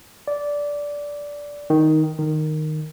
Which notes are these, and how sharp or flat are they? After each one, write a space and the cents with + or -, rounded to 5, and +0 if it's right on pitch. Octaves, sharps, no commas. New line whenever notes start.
D5 -10
D#3 +5
D#3 -10